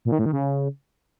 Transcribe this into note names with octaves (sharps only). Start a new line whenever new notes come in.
A#2
D#3
A2
D#3
C#3